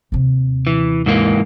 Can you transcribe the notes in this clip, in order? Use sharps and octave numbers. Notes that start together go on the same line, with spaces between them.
D#2 C3
E3
G#2 E3 A#3